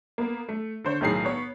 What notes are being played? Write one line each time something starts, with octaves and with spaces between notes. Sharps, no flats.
A#3 B3
A3
D3 C5 C#5
B1 A2 D#3 F#3 G#4 C7
B3 C#5